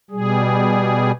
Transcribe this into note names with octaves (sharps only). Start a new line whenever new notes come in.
B2 G3 G#4